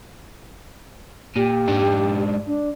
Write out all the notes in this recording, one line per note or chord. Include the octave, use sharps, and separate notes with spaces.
A#2 G4
G#2 D4
D4